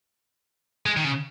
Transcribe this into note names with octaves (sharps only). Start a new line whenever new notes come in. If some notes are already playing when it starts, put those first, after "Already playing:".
G#3
D#3
C#3